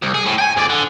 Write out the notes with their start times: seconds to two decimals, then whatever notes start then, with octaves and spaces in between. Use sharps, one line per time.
0.03 C2
0.15 G#4
0.26 A2
0.39 G5 G#5
0.57 F2 D5
0.70 D3